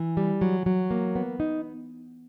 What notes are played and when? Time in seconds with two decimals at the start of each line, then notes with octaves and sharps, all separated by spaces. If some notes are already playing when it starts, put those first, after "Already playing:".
Already playing: E3
0.17 G3
0.41 F#3
0.66 F#3
0.91 A#3
1.16 B3
1.40 D#4